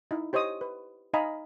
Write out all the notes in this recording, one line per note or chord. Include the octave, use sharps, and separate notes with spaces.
D#4 E4
G4 C5 C#5 D#5 D#6
B4
D#4 D#5 F5 G#5 A#5 B5